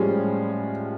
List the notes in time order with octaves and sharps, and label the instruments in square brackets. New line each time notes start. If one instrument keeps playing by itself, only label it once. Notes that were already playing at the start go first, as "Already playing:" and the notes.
Already playing: [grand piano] A2 F3 G#3 C#4 [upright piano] G3